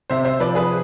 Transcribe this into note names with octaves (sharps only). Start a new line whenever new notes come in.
C3 C5 E5
C5 E5
F3 B4 D5
G#4 B4